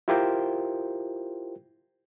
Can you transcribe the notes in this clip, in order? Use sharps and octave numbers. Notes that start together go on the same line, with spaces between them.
E4 F4 G4 A#4 C5 G5